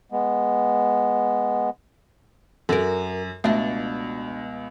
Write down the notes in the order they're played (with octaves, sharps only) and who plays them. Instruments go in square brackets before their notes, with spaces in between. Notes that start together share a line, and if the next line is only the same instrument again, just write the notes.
[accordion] G#3 B3
[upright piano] F#2 [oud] F#4 A#4 [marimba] A4
[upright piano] C#2 B2 [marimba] A3 E5 [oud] D4 F#4